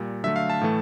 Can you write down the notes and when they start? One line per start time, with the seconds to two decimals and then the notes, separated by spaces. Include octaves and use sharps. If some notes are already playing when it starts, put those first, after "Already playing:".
Already playing: A#2 G3
0.24 D3 F#3 A3 E5
0.36 F5
0.50 A5
0.61 A2 E3 A3